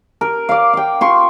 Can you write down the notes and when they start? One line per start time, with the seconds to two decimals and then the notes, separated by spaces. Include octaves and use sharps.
0.21 A#4
0.49 D5 F5
0.73 F5 G5
1.01 F4 C6 C#6